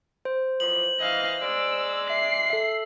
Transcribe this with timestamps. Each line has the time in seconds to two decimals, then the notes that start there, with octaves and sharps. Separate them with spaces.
0.25 C5
0.60 E2 F3 F#7
1.00 E3 D#5 F5
1.42 G#3 D5 E6
2.10 E5 C7
2.50 A4 E5